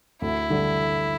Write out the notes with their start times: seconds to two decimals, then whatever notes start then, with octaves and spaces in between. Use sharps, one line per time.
0.22 D2 E4
0.50 D3 G3 D4